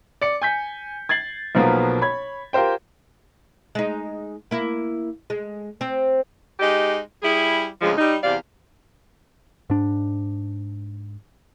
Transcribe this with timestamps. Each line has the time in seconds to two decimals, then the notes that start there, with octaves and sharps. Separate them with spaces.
0.21 D5 C#7
0.42 G#5 G6 B6
1.09 G#6 A6 C7 F#7
1.55 B1 B2 F3 F#3 A#3 B3
2.01 C#5 B5 G#6
2.53 F4 G4 A#4 C5 G5
3.75 G#3 D#4
4.51 A#3 E4
5.30 G#3
5.81 C4
6.60 G#3 D#4 G4
7.22 G3 E4 G#4
7.82 D2 C#3 F3 G#3
7.97 G3 D#4
8.24 E2 C3 D5 F5
9.70 G#2 D4